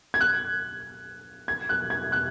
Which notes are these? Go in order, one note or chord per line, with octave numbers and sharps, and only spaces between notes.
G#6
F#6
G#6
F#6
G#6
F#6